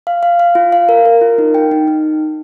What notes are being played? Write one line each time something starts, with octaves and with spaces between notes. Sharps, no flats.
F5
F5
F5
F4
F5
A#4
A#4
F4
D#4
G5
D#4
D#4